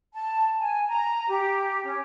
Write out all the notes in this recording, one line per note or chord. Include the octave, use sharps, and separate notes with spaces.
A5
G#5
A#5
G4
C#4